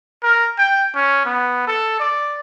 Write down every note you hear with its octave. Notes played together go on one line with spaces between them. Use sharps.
A#4
G5
C#4
B3
A4
D5